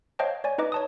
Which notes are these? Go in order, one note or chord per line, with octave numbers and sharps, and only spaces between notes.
C5 C#5 D#5 F5 G5 A5
C#5 D5 G#5
D#4 B4 D#5 D6
C#5 A5 D#6